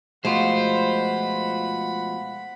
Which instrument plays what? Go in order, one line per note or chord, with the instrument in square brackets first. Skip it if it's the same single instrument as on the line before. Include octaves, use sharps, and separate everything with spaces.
[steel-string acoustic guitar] B2 F3 A3 [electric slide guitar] G#3 F4 [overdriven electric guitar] C5 [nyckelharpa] F#5 B5